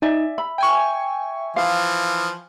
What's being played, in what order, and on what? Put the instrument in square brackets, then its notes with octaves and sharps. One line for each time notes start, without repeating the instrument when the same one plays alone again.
[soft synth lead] D#4 [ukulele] D5 E5 G#5
[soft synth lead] E5 [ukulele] B5
[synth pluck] G5 G#5 C#6
[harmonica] E3 F3 [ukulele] F5